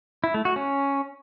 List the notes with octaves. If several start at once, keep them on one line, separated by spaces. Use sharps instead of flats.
E4
A3
F#4
C#4